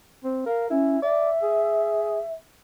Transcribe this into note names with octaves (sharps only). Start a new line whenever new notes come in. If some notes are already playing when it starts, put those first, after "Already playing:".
C4
A#4 F5
C#4 E4
D5 E5
G#4